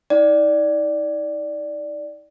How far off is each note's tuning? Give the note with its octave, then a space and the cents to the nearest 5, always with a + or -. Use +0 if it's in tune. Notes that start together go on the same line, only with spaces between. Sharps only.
D#4 +40 D5 +0 G5 -25